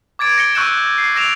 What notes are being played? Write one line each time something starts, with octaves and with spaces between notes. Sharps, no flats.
D6 G#6 A6 D7
A#6 C#7 G7
C#6 E6 F#6 G6 C#7 E7
C7
E6 A#6 D7 E7 F7